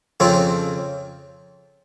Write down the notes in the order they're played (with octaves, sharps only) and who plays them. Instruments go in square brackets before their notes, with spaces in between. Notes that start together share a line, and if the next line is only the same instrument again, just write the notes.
[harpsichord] F2 C#3 F3 C4